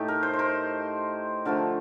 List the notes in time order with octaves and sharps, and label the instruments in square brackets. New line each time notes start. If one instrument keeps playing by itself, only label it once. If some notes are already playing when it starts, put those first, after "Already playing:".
Already playing: [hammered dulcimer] A2 A3 D#4 G4
A#4
C5
C5
A#4
D3 F3 A3 A#4